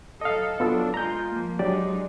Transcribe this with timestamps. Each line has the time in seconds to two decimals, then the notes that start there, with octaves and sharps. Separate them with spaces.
0.21 F#3 D#4 A4 D#5 F5
0.60 F#3 B3 D4 F4 A4
0.94 G#3 B3 F4 A#5 G6
1.29 F3 A#3
1.59 F#3 G#3 D4 D#4 G4 D5